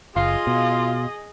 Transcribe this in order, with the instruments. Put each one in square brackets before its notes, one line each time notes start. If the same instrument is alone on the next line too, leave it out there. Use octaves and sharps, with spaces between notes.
[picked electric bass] F#1 [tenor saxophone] F4 [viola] G#4 D#5 [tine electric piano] F5 C6
[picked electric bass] B2